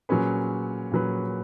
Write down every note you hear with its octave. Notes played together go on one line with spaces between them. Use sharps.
A#2 F#3 C#4 G#4 B4
A#2 F#3 C#4 G#4 B4